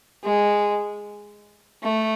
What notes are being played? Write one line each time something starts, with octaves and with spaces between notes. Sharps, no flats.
G#3
A3